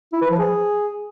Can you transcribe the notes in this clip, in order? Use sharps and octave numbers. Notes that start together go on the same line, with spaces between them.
E4
B4
F3
G#4